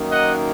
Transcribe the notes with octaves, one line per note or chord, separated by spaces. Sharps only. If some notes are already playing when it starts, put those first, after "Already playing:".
Already playing: F#2 D#3 A#3 D#4
D#5 F#5